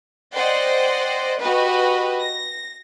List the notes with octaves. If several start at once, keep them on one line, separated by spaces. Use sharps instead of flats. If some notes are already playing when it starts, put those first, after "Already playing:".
C5 D5 D#5 F#5 G5 C6
F#4 G4 B4 D#5
A#6